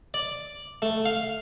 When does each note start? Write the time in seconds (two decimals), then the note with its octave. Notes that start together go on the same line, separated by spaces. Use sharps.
0.14 D5
0.82 A3
1.06 F5